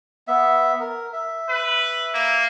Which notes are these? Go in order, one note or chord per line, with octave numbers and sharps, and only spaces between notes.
B3 E5
A#4
E5
B4
A#3